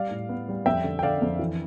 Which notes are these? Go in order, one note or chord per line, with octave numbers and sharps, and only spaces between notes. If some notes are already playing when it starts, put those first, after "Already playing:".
Already playing: G3 D5 F5
A2
B3
G3
F2 E5 G5
D3
G5
D3 D5 F5
F2
E3